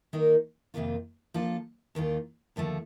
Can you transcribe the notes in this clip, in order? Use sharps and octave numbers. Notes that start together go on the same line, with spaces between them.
D#3 A#3 D#4 A#4
F2 C3 D#3 A#3 F4
F3 A#3 D4 F4 A4
D#2 D#3 A#3 F4
D#2 D3 F3 A3